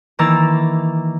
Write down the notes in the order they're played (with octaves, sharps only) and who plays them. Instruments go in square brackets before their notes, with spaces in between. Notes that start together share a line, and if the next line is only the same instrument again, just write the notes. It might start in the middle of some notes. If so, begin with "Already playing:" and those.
[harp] D#3 E3 A#3 A#5 E6 A6